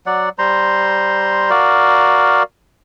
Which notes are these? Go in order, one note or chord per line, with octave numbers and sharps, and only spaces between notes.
F#3 D5 F#5
G3 C5 A#5 C6
F#4 A#4 D5 F5